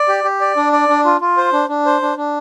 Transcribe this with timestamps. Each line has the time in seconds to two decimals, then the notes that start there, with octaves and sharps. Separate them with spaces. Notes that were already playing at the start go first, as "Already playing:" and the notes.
Already playing: D5
0.08 G4
0.24 G4
0.41 D5
0.57 D4
0.73 D5
0.88 D4
1.05 F4
1.21 F4
1.37 C5
1.53 D4
1.69 D4
1.86 C5
2.02 D4
2.17 D4